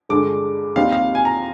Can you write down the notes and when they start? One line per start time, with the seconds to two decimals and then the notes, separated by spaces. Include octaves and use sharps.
0.09 G2 D3 G#3 D4 D6
0.76 D#2 D#3 G3 C4 F5
0.92 F5
1.15 G#5
1.25 A#5